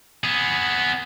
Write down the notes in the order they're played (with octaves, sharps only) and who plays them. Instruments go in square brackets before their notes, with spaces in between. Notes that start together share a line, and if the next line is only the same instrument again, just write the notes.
[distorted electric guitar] B3 G#4